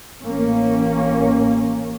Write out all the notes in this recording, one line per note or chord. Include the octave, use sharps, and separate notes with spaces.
A1 A#3 C#4